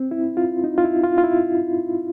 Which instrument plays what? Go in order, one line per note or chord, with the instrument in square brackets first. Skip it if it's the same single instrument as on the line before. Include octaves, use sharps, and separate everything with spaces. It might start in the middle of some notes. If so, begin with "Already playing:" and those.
Already playing: [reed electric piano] C4
E4
F4
D#4
F4
E4
F4
F4
E4